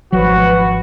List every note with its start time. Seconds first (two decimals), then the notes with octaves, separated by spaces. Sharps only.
0.12 G#1 F3 F#3 F#4 B4